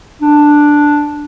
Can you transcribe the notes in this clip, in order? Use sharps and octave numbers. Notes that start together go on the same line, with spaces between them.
D4